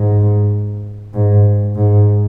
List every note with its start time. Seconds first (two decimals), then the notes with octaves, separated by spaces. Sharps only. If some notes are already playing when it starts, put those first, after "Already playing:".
Already playing: G#2
1.14 G#2
1.76 G#2